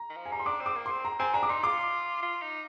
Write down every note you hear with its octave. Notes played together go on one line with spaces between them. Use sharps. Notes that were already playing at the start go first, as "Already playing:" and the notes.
Already playing: A#5
D#3
F3
G#5
G3 A#5
C6
D4 D6
C4
D6
A#3
C4 C6
A#5
C4 G#5
D4 A#5
D6
D#4 C6
F4 D6
F4
D#4